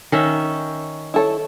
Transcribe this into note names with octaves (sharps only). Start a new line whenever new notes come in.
D#3 C#4 E5
E4 A4 C#5